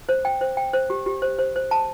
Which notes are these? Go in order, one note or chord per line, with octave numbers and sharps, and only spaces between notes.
C5
G5
C5
G5
C5
G4
G4
C5
C5
C5
A5